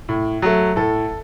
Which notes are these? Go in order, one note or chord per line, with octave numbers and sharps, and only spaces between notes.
A2
F#3 A3
A2 A4